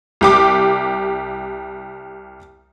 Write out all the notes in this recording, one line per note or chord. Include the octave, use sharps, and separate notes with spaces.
C2 G4 D6